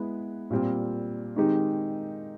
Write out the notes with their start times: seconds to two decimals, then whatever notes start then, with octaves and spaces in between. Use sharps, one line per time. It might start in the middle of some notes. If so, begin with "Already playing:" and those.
Already playing: G#3 B3 E4 B4
0.50 A#2 G3 C4 F4
1.36 D#3 G#3 C4 D#4 G4